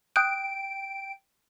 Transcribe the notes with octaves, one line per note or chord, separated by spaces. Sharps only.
G5 D#6 F#6 G6 D7